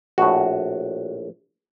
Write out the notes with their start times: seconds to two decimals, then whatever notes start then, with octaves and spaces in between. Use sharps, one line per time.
0.18 A#1 A2 F#4